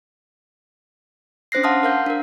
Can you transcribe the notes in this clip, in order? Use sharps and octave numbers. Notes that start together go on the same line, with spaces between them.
C#4 D4 C5 F#6 A#6 C7
F5 F#5 A5 C6 D#6 F6
A#4 F5 G6
D4 A#4